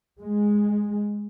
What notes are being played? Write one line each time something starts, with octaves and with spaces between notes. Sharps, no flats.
G#3